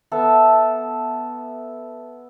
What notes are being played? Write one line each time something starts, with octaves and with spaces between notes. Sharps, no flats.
B3 A4 E5 A5